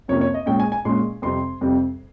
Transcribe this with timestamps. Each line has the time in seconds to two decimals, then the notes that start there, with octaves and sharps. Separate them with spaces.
0.08 F2 C3 F3 A#3 C#4 C#5
0.21 C#5
0.34 D#5
0.46 A#2 G#3 C#4 G5
0.60 G#5
0.72 G#5
0.85 A#2 G#3 C#4 C6
1.22 F2 C3 G3 C4 C6
1.61 F2 C3 G3 C4